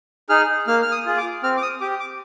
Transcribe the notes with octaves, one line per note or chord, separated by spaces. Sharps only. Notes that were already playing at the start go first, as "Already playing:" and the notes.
D#4 G#4 F6
A#3 F6
F6
D#6
F4 G#4
D6
C4 F6
D6
D#6
G4 D6
D6